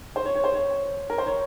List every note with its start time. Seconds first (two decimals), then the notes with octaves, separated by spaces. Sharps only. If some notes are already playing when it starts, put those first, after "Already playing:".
0.16 C5
0.25 C#5
0.35 C#5
0.44 C5
0.54 C#5
1.10 A#4
1.18 C5
1.26 C#5